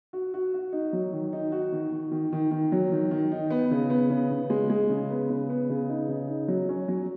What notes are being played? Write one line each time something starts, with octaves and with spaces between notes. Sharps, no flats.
F#4
F#4
F#4
D#4
F#3
D#3
D#4
F#4
D#3
D#3
D#3
D#3
D#3
F#3
D#3
D#3
D#4
B3
C#3
B3
C#3
C#3
G#3
G#3
C#3
B3
C#3
B3
C#3
D#4
C#3
D#4
F#3
C#4
F#3